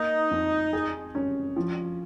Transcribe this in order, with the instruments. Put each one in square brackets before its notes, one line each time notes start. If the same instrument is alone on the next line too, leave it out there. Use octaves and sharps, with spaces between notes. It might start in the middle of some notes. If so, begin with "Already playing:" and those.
Already playing: [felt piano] A#3 [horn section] D#4
[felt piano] F2
G#4
C#4
F3